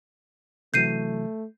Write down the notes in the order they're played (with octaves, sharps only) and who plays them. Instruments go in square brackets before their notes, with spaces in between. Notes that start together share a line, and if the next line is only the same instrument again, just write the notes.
[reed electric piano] C3 E3 F#3 [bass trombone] A3 [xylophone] G6 C7 D#7